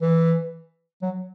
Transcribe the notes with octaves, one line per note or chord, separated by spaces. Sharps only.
E3
F#3